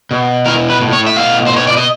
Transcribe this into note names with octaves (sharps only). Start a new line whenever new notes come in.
B2
E3 A#4
B4
A2
C#5
E5
B2 F5
B2 C5
C#5
D5
D#5